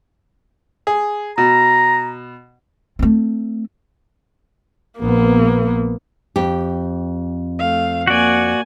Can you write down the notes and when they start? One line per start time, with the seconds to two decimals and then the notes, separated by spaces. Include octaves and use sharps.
0.87 G#4
1.38 B2 A#5
2.99 A3 C4
5.00 A#1 A#3 B3
6.36 F2 G4
7.59 A3 F5
8.07 A#3 F#4 D5 G#5